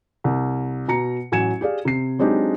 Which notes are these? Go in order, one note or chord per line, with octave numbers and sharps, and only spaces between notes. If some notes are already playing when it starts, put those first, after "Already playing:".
C2
B2 A#5 C#7
A1 F#3 G#5 G#6 C#7 E7
G4 G#4 D5 F5
C3 C7
F#3 G#3 C4 D4 D#4 G4